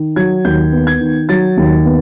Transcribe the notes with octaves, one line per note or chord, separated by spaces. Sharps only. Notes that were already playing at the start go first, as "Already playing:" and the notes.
Already playing: D#3
F#3 G#6
D#2 G6
B3
G#6
D#3
F#3 A6
D#2
B3